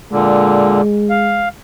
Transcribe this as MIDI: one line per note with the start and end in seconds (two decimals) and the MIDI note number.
0.12 0.81 46
0.12 0.81 50
0.12 1.53 56
1.10 1.49 77